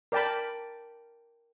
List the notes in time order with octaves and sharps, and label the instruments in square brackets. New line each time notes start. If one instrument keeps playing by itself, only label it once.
[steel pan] A#4 D5 G5 A5 B5